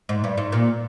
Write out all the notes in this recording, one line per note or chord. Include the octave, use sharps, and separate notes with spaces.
G#2
G2
G#2
A#2